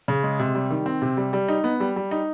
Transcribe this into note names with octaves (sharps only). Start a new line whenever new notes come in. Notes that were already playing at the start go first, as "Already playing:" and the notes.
C#3
G#3
C3
G3
D#3
C4
C3
G3
G3
D#4
B3
G3
G3
D#4